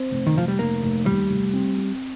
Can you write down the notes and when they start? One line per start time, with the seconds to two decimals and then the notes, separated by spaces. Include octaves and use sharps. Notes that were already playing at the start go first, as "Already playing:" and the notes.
Already playing: C4
0.11 F1
0.27 D#3
0.35 F1 F3
0.48 G3
0.59 F1 A#3
0.83 F1
1.06 D#2 G3
1.30 F1
1.53 C4
1.78 C4